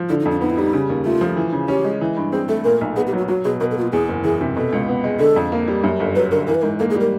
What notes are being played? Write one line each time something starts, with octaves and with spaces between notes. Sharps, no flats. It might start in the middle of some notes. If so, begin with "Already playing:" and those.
Already playing: F3
D3 E4
D#4
F2
D4
B3 D#4
E4
G3 D#4
C#3
D#2
A3 F4
F3
E3
C#3
C#4 G4
G#3
E3
G2
C4 G#4
A3 A4
A#2 A#4
B1
B3 G#4
G4
F#3 F#4
F#3 F#4
B2 G#4
B2 A#4
A4
A#3 F#4
F4
E2 G#4
F#1
E3 G#4
C3
B2 A4
C#2
B3
G#3
D3 A4
F2
A#3
G3
F#2
G1
F#3 B4
D3 A#4
E3 A#4
B4
G#2 A#4
A#3 A4
G#4
G3 A#4